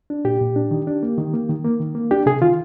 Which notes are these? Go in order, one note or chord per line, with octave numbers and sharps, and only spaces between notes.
D4
A#2 G4
A#2
D4
D#3
D4
A#3
D#3
A#3
D#3
A#3
D#3
A#3
D4 G4
C3 G#4
D#3 F4